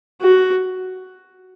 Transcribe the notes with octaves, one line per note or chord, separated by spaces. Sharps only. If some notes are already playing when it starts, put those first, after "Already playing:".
F#4